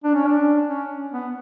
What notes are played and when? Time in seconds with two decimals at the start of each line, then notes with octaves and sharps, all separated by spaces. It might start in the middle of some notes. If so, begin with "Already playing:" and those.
0.04 D4
0.14 C#4
0.26 D4
0.68 C#4
1.12 B3